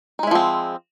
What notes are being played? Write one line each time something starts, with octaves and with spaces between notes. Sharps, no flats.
F3 G#3 C4 D#4 E4